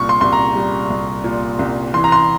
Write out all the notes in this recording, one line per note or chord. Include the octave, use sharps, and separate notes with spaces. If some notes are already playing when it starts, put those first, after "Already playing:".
Already playing: C2 A#2 G3 C#6
C6
C2 C6
A#5
G3
C2
A#2
C2
E3 C6
A#5
C6